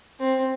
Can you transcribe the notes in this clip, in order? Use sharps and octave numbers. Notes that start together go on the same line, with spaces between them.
C4